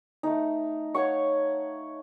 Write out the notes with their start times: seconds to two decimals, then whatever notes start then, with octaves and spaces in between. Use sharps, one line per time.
0.23 A3 D#4
0.95 C#5 F5 F#5 C#6